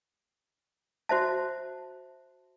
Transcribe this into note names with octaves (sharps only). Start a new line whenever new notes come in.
F#4 C5 E5 A5